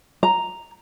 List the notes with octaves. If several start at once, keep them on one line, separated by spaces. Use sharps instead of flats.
A#5